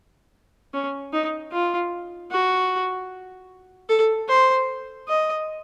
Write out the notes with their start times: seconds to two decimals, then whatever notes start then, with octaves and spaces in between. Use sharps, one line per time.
0.74 C#4
1.13 D#4
1.52 F4
2.31 F#4
3.89 A4
4.29 C5
5.08 D#5